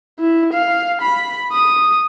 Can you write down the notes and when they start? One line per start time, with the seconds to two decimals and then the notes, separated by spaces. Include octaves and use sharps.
0.20 E4
0.53 F5
1.02 B5
1.53 D#6